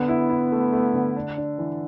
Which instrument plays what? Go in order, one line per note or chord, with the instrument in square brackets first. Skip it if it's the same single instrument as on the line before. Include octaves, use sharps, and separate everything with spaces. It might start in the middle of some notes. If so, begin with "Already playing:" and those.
Already playing: [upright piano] D3 [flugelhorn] B3
[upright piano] E4
E4
A3
A3
D3
D4
D4
E3